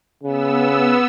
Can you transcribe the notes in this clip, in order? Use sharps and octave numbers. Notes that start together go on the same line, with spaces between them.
C#3 B3 E6